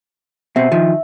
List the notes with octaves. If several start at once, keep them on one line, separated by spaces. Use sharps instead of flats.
B2 C4 E5
D#3 F3